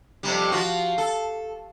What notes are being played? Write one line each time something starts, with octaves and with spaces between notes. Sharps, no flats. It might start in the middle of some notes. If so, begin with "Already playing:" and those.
F2 C3 G3
F3 F4 F#4
A4